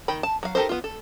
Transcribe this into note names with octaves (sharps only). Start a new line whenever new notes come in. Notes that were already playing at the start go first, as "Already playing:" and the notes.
D#3 G5 B5
A5
F#3 F5
D#4 G4 A4 A#4 C5
B3 F4
A4